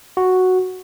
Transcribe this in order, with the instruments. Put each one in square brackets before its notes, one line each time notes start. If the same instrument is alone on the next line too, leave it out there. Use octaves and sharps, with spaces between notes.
[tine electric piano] F#4